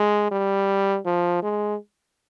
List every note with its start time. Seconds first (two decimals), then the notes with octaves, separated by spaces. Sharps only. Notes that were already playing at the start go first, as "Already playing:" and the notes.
Already playing: G#3
0.32 G3
1.05 F3
1.43 G#3